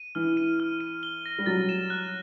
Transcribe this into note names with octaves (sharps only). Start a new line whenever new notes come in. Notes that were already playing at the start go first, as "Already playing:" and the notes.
Already playing: D#7
E3 F6
D#7
F6
D#7
G7
A#6
G3
F#3 A6
E7
F#6